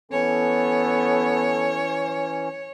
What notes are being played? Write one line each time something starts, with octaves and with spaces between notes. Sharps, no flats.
E3 B3 C#4 A4 C#5